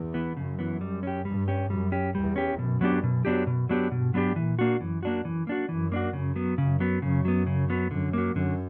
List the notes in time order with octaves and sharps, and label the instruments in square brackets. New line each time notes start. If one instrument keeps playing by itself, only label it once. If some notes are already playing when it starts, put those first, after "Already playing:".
Already playing: [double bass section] E2
[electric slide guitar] E3 B3
[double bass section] F#2 [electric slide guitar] C#3
[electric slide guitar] E3 B3
G3
C#4 G4
[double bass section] G2 [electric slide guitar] G3
[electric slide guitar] C#4 G4
[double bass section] F#2 [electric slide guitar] G3
[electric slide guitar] C#4 G4
[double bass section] E2 [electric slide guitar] G3
[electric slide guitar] C#4 G4
[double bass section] F#2 [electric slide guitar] B2
[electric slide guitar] F#3 B3 D4 G4
B2
F#3 B3 D4 G4
B2
F#3 B3 D4 G4
[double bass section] G2 [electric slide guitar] B2
[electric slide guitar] F#3 B3 D4 G4
[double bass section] A#2 [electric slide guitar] E3
[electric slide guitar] A#3 D4 F#4
[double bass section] F#2 [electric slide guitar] E3
[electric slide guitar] A#3 D4 F#4
[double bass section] F#2 [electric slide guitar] E3
[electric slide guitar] A#3 D4 F#4
[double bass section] F#2 [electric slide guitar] E3
[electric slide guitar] A#3 D4 F#4
[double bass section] F#2 [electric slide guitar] C#3
[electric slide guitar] F#3 B3
[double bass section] F#2 [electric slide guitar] C#3
[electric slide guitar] F#3 B3
[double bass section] F#2 [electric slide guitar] C#3
[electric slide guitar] F#3 B3
C#3
F#3 B3
[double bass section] F#2 [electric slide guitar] D3
[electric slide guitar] F#3 A#3
[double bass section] F#2 [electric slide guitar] D3